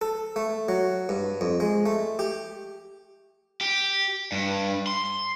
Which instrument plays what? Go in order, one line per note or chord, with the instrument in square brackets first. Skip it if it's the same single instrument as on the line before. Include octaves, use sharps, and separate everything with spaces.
[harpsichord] A4
A3
F#3
G2
F2
G#3
A3
G4
[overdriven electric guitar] G4
G2
C6